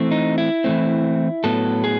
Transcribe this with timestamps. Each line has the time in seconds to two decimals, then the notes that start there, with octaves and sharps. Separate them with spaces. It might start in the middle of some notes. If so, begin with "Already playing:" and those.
Already playing: E3 A3 C4
0.11 D#4
0.38 E4
0.64 E3 A3 C4
1.44 A2 F#3 B3 A4
1.84 G#4